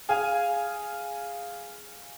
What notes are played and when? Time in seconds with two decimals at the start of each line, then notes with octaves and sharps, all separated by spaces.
0.09 G#4 F5 G#5